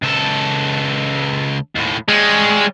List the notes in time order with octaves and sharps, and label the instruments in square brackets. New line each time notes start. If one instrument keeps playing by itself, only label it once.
[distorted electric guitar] C#2 A4
D#2 A2
[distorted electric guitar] G3 C#5 [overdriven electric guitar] G#3